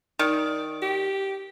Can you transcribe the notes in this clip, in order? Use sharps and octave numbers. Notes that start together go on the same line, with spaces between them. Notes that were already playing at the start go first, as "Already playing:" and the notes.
D#3 D5
G4